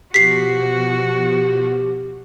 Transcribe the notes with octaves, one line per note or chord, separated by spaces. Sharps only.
B2 F3 F#4 G4 B6 C7